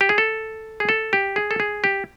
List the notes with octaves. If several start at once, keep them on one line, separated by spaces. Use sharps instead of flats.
G4
G#4
A4
G#4
A4
G4
G#4
A4
G#4
G4